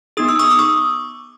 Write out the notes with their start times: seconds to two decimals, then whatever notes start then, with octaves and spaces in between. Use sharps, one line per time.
0.17 B3 D#4 G#4 D#6
0.29 E6
0.39 C#6 D#6
0.50 D6 E6
0.59 C#6 D#6